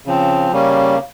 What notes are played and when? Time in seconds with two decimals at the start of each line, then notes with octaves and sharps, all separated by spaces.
0.06 C#3 F3 C4
0.52 C#3 G3 A#3 C#4